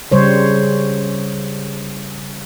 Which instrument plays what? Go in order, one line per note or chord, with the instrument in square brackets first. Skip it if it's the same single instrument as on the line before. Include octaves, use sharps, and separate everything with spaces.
[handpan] C#3 G3 C5 C#5